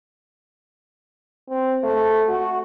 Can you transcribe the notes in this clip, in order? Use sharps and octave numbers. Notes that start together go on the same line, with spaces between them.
C4
A3
F#4